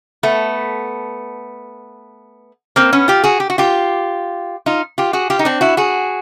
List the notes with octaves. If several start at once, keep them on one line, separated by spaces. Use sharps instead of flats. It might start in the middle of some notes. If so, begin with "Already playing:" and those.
A3 B3
A#3 C4
B3 C#4
F4 G4
F#4 G#4
G4
F#4
F4 G4
D#4 F4
F4 G4
F#4 G#4
F4 G4
D#4
C4 D4
E4 F#4
F#4 G#4